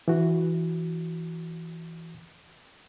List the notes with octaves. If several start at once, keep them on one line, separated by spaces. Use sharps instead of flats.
E3 F#4